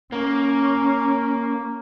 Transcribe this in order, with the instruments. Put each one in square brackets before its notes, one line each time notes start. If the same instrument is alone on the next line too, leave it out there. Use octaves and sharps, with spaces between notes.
[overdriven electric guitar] A#3 [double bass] C#4